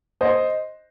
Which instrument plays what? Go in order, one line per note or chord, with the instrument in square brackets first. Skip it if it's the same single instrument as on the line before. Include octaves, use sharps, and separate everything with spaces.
[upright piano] C5 D#5